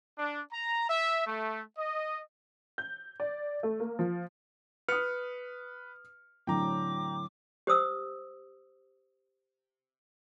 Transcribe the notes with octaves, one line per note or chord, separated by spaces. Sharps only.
D4
A#5
E5
A3
D#5
G6
D5
A3
A#3
F3
B4 D#6 F6 C#7
A2 D3 F#3 C4 G5 A#5 D6
G4 C5 D#6 E6